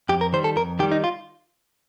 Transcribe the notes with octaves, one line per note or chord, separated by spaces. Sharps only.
F2 G4
A#4
D#3 G3 C5
A4
F2 A#4
D#3 G3 G4
D#4
F4